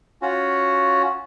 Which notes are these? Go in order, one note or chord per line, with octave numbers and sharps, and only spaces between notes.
C#4 F4 F#4